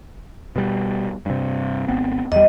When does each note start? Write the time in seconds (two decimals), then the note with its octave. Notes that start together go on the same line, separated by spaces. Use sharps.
0.56 B2 G3
1.26 G2 C3
1.88 G#1 B3 C4
2.32 E2 G3 D#5